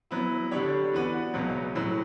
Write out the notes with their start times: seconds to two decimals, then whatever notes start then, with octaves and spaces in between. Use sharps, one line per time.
0.11 F#3 B3 E4
0.51 D3 G3 D4 G4 C#5
0.93 E3 B3 F#4 B4 D5
1.34 C#2 B2 F#3 C#4
1.76 A2 F#3 C#4